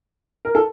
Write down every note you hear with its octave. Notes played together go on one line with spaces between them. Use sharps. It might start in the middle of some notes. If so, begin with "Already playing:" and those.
A#4
A4